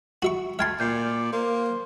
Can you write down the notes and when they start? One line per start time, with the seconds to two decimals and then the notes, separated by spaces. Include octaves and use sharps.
0.22 F#4 E5 C#6
0.59 A3 E5 G5 C6 F6 G#6 A6
0.80 A#2 D5 G6 C7
1.33 A#3 C5